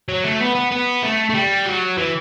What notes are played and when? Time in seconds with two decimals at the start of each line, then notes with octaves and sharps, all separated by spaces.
0.09 F#3
0.24 A3
0.41 B3
0.55 B3
0.72 B3
1.03 A3
1.30 A3
1.35 G3
1.66 F#3
1.98 E3